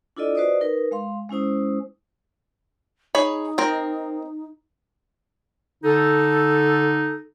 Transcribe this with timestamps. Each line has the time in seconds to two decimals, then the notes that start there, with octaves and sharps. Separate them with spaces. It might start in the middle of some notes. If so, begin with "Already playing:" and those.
0.16 D4 E4 F4 A4 D5 D#5
0.35 F#4 B4 C5 D5 D#5 D#6
0.61 D#4 A#4 B4
0.91 G#3 F5 C6
1.30 G#3 C#4 E4 C5 D#6
3.15 D#4 G#4 C#5 B5
3.58 C4 A#4
5.84 D3 D#4 A4